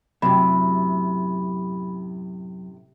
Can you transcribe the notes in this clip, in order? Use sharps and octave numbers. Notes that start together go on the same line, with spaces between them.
F#2 A2 C3 B5